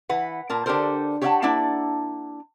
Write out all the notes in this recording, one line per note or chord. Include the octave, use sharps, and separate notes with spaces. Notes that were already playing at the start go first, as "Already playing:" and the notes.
E3 B4 F#5
A#2 A#4 A5
D3 D4 G4 A4 A#4 C5
G4 C#5 D5 F5 F#5 A5
A#3 D4 E4 F#5 A5